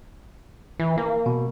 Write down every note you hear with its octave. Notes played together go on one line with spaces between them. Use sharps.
E3
A#3
B2